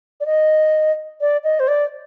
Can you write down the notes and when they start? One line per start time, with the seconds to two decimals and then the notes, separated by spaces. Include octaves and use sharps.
0.20 D5
0.26 D#5
1.21 D5
1.44 D#5
1.60 C5
1.68 D5